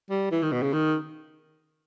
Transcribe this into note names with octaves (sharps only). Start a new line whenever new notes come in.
G3
E3
D#3
B2
C#3
D#3